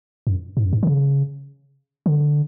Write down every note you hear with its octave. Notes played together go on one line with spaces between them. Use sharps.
F#2
G#2
F#2
G#2
D3
C#3
D3